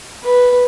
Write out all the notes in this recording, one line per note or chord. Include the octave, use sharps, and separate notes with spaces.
B4